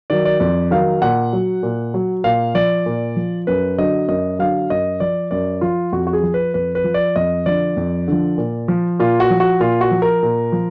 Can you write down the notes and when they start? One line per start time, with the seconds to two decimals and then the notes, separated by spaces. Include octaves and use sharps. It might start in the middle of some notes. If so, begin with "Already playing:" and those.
0.10 D#3 F#3 D5
0.25 D5
0.40 F2 D5
0.71 D#3 F#3 F5
1.02 A#2 F#5
1.33 F#3
1.63 A#2
1.94 F#3
2.24 A#2 F5
2.55 F3 D5
2.86 A#2
3.16 F3
3.47 F#2 B4
3.78 D3 F#3 D#5
4.09 F#2 D#5
4.39 D3 F#3 F5
4.70 F#2 D#5
5.00 F3 D5
5.31 F#2 D5
5.61 F3 F4
5.92 F2 F#4
6.07 F#4
6.13 G#4
6.23 F3
6.34 B4
6.54 F2 B4
6.75 B4
6.84 F3
6.94 D5
7.16 F2 D#5
7.46 D3 F3 D5
7.77 F2
8.08 D3 F3
8.38 A#2
8.68 F3
8.99 A#2 F4
9.20 F#4
9.30 F3
9.40 F#4
9.60 A#2 F4
9.81 F#4
9.91 F3
10.02 A#4
10.23 A#2
10.52 F3